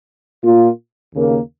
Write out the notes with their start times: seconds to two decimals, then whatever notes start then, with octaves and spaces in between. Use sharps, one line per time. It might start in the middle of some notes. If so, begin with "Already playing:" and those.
0.43 A#2 A#3 F4
1.14 D#2 C#3 A#3